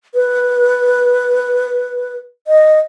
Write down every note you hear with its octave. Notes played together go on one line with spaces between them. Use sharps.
B4
D#5